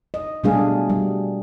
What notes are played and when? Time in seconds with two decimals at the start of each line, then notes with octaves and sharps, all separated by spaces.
0.14 D#5
0.44 B2 G3 A3 D4 G#4 F5
0.90 G3